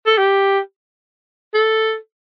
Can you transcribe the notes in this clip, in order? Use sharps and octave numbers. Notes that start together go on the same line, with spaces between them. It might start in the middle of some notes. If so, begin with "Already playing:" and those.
A4
G4
A4